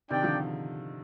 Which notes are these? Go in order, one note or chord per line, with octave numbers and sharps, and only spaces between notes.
C3 D#3 D4 G4 D5 G5
D3 F3